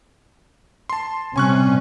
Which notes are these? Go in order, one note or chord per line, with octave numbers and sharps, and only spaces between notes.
A5 C6
C3 G3 C#4 G#5 C#6 F#6